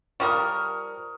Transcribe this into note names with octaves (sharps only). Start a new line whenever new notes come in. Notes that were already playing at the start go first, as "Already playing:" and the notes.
F3 G3 A#4 C#6 D#6 F6